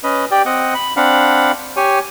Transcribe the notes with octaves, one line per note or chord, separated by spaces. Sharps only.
C#4 B4 D#5
G4 D5 G5
C4 D#5 F#5
B5
C4 D4 F5 F#5 B5
G4 C#5 G#5